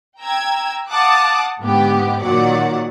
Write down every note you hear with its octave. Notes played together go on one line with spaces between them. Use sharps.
G5 A#5 E6 G#6
F5 F#5 A5 D6 D#6 F#6
G#2 D3 B3 G4
A#2 D#3 F#3 D5 F#5